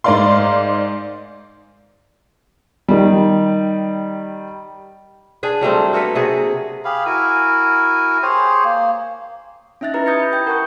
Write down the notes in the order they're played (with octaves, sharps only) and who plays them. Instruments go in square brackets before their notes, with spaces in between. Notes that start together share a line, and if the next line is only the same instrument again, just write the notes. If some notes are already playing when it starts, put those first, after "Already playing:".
[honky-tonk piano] G#2 A#4 D5 F5 C6
[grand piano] D#3 G3
[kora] D4 G#4 G5
F#3 G3 A3 C4
A#3 F#4 A4 B4
C3 F#4 G#4
[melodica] G4 G#4 F5 B5
E4 F#4 A#4 G#5
G4 G#4 C5 C#5
A#3
[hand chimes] C#4 D#4 E5 F#6 A6
E4 G4 B4 A#5
D#6 G6 G#6 A#6 C#7
B5
E4 G5 G6
A#4 F#5 A5 C#6 F#6 G6